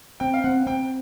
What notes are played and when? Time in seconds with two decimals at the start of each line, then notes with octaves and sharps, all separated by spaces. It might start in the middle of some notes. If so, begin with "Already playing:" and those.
0.20 C4 G5
0.34 F5
0.44 C4 F#5
0.66 C4 G5